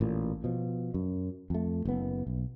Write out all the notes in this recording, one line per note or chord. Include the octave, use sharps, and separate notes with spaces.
A1 A#2
B2 F3
F#2
F2 A3
F#1 B3
B1